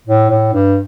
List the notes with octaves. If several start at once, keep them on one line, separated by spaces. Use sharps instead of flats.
A2
A2
G2